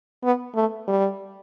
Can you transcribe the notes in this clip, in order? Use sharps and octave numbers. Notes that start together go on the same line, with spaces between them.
B3
A3
G3